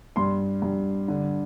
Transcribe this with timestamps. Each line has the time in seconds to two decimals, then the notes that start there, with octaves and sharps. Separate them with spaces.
0.16 G2 C6
0.62 G2
1.08 D3